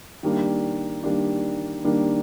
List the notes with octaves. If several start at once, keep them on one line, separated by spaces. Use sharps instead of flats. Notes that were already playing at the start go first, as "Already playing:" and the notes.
D#3 G3 A#3 D4
D#3 G3 A#3 D4
D#3 G3 A#3 D4